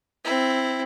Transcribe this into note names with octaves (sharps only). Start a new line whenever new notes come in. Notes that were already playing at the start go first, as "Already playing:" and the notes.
C4 E4